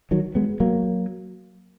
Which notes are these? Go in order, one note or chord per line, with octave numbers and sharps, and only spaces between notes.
D#3 F#3
G#3 B3
F#3 A#3